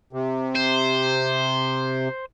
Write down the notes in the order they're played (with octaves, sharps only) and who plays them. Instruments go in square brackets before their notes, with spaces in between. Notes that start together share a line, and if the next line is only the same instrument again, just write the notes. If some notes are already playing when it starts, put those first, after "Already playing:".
[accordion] C3
[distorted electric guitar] C5